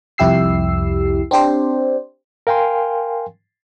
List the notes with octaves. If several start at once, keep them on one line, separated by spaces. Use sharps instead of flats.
C2 F2 E4 G4 E6 C7
C4 D4 G4 C5
A#4 F5 G5 G#5 C6